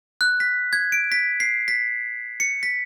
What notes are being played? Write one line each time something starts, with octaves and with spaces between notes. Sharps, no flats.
F#6
B6
G#6
D7
B6
C7
B6
C#7
B6